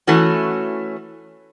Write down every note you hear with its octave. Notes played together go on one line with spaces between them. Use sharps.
E3 A3 C#4 F#4